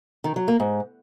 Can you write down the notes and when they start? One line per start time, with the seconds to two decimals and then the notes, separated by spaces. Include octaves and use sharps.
0.24 D#3
0.36 F#3
0.48 A#3
0.60 G#2